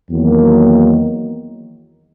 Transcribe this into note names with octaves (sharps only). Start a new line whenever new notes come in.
E2 D#3 F#3 A#3